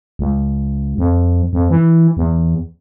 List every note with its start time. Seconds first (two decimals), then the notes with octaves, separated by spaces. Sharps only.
0.19 C#2
0.98 F2
1.53 F2
1.70 E3
2.17 E2